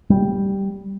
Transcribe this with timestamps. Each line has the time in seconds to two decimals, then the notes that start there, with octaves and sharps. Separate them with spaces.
0.10 G3